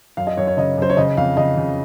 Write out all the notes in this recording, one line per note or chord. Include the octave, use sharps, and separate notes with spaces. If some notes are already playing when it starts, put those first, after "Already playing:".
F#2 F5
D#5
F#2 C#5
C#5
C#3 D#5
F#2 C5
C#5
C#3 D#5
F2 F5
C#3 D#5
C#3